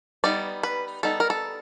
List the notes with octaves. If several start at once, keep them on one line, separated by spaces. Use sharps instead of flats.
G3 B3 D#4 D5
B4
G3 B3 D#4 A4
A#4
A4